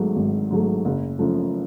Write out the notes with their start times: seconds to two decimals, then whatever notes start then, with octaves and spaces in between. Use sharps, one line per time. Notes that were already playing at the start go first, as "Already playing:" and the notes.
Already playing: G#1 G#2 F#3 A3
0.16 G#1
0.51 G#2 F#3 A3
0.85 F#1
1.19 F#2 F3 A3